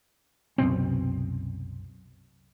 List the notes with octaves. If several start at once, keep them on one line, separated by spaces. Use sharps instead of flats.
C2 F#2 B2 C4